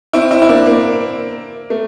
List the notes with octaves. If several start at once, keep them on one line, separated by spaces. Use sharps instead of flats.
C4 E4
C4 E4
E4
A#3 D4
A#3
A3